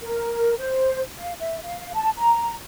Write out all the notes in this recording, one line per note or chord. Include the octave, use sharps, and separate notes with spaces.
A#4
C5
F5
E5
F5
A5
A#5